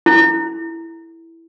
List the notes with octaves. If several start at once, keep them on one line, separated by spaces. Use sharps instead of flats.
E4